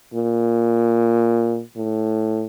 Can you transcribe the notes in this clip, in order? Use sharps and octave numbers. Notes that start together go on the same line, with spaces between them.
A#2
A2